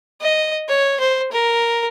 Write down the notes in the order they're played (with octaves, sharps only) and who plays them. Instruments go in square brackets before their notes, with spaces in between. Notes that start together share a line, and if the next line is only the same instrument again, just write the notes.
[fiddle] D#5
C#5
C5
A#4